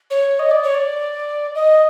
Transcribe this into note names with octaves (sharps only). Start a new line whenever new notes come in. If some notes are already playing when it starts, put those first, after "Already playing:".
C#5
D#5
D5
C#5
D5
D#5